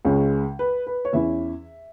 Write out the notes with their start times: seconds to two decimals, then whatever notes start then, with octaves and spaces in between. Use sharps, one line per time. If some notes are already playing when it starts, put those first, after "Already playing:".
0.05 C#2 C#3 G#3 C#4
0.59 B4
0.87 B4
1.05 C#5
1.13 E2 E3 C#4 E4 E5